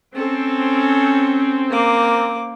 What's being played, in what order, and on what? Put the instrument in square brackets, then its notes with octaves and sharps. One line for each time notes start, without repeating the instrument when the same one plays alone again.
[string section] C4 [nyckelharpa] C#4 A4
[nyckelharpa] A#3 D6